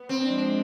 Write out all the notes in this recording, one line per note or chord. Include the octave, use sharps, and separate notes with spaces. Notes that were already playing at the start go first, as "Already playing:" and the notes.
Already playing: B3
C4
F3 G#3 D4